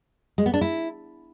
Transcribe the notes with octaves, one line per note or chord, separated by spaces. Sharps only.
G#3
B3
D4
E4